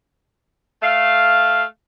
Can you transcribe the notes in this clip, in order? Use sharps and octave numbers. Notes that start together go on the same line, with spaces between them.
A3 F5